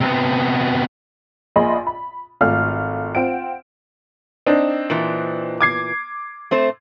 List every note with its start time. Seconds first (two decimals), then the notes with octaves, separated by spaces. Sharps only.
0.01 C3 B3
1.56 A#1 A#2 G#4 D#5 B5 C6
1.87 B5
2.41 G#1 A3 F4 F5 F6
3.15 C4 F4 F#5 D7
4.46 C4 D4 D#4
4.90 A#2 E3
5.61 D6 G#6 C7
6.51 A3 C4 C5